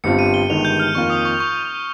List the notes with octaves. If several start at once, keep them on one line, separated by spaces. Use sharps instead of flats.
G1 G2 G3 C4 F4 C#7
D#7
G7
G1 G2 D#3 G#3 F7
G6
F6
F2 D#3 A#3 F4 A#4 C#6
D#6
C#6
C#6